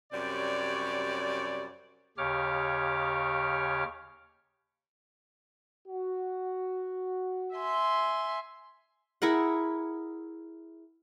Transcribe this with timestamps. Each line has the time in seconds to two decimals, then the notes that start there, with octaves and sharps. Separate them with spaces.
0.12 F#2 C3 G3 C#5 D5
2.18 D#2 C#3 G4 C#5 D6 F6
5.88 F#4
7.56 E5 G#5 C6
9.22 E4 G#4 A#4 F#5